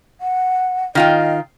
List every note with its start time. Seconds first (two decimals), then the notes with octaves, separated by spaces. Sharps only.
0.21 F#5
0.95 D#3 F4 D#5 G5